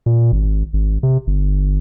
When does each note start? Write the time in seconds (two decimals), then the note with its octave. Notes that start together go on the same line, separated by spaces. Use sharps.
0.06 A#2
0.32 G#1
0.73 G#1
1.03 C3
1.27 G1